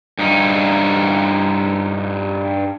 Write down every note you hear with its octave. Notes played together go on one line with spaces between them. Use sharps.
G2 D#4